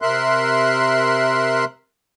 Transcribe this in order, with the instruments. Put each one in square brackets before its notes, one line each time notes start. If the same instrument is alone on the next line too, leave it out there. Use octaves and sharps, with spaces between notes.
[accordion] C3 A#4 E5 C6 F#6